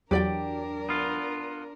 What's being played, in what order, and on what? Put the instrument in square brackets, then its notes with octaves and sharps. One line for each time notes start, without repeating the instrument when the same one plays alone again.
[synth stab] E2 F#3 [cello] D4 A#4 [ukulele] G4 D5 G5
[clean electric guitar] B3 F4